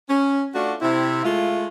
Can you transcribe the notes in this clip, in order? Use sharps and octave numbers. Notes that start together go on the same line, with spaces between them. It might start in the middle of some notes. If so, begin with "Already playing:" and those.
C#4
A3 D4 F4 F#4
C3 C4 E4
G#3 A3 F4